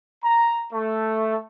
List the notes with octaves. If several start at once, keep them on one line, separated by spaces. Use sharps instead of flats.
A#5
A3